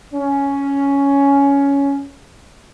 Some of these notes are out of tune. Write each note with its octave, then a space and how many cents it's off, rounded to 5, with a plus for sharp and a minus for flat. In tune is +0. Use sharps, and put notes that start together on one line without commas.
C#4 +10